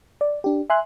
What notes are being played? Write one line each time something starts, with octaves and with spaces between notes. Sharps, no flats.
D5
D4 G4
E5 G#5 C6 F#6